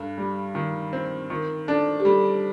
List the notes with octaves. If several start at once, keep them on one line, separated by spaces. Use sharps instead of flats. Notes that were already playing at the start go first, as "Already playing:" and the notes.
Already playing: G2 A4
G3
D#3
C4
D#3 A#4
D4 A4
G4
G3 A4